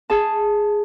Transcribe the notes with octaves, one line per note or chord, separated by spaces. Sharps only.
G#4 A5